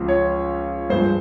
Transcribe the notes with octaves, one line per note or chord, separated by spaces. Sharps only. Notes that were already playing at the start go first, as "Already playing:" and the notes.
Already playing: C#2 C#3 F3
C#5
G2 F3 G#3 C5